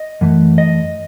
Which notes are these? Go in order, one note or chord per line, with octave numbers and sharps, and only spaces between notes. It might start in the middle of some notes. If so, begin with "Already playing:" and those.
Already playing: D#5
F#2 E3 A3
D#5